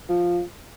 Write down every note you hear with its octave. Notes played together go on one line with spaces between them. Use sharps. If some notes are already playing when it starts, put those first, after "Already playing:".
F3